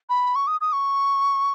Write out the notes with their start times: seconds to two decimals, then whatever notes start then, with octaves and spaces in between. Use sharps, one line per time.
0.09 B5
0.35 C#6
0.47 D#6
0.61 D#6
0.73 C#6